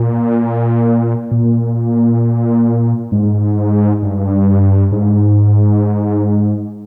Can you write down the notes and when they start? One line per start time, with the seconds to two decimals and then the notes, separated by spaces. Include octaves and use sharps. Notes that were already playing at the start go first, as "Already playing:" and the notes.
Already playing: A#2
1.32 A#2
3.12 G#2
4.03 G2
4.92 G#2